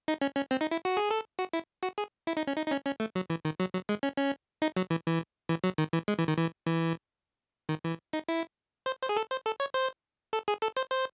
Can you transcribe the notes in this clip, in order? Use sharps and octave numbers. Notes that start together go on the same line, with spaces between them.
D#4
C#4
C#4
C4
D#4
E4
F#4
G#4
A4
F#4
E4
F#4
G#4
E4
D#4
C#4
D#4
D#4
C#4
C#4
A3
F#3
E3
D#3
F#3
F#3
G#3
C#4
C#4
D#4
F#3
E3
E3
E3
F#3
D#3
E3
G#3
E3
D#3
E3
E3
D#3
E3
D#4
E4
C5
C5
G#4
A4
C5
A4
C#5
C5
A4
G#4
A4
C5
C5